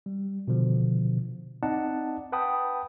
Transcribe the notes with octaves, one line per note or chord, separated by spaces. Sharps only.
G3
B2 D3 F3
C4 D#4 D5 D#5 F#5 A5
B4 F#5 G5 A5 B5 D#6